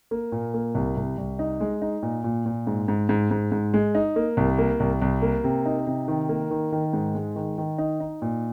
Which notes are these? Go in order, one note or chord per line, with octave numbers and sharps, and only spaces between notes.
A#3
A#2
A#3
C2
C2
C2
D#4
G#3
D#4
A#2
A#2
A#2
G#2
G#2
G#2
G#2
G#2
G#3
D#4
A#3
C2
A#3
C2
C2
A#3
C3
D#4
C3
D#3
A#3
D#3
D#3
G#2
G#3
D#3
D#3
D#4
D#4
A#2